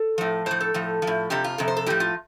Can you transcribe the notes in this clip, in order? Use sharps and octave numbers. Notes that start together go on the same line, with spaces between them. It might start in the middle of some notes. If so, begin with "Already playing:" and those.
Already playing: A4
A2 F3
A2 F3 C5
A4
A2 F3
F3
A2
F2 C3 F3 G4
F4
F2 C3 A4
C5
A4
A2 F3 G4
F4